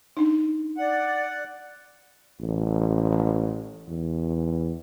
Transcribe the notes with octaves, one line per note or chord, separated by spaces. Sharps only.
D4 D#4
D5 F#5
A1
E2